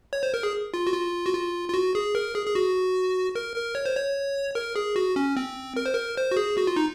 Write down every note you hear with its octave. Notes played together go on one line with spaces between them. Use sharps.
C#5
C5
A#4
G#4
F4
F#4
F4
F#4
F4
F4
F#4
G#4
A#4
G#4
G#4
F#4
A#4
A#4
C#5
C5
C#5
A#4
G#4
F#4
C#4
C4
A#4
C5
A#4
C5
F#4
G#4
F#4
F4
D#4